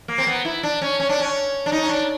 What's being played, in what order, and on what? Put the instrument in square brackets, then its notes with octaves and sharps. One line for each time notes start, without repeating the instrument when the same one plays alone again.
[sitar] A#3
C4
B3
E4
D4
C#4
C#4
D4
C#4
D4
D#4
C#4
D4